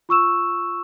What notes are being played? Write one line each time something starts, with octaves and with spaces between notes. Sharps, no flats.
F4 C#6 E6 E7